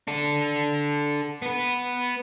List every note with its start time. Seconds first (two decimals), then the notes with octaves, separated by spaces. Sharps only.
0.08 D4 A4
1.42 B3 B4